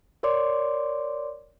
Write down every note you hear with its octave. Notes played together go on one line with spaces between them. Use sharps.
A#4 C#5 D5 C6 D6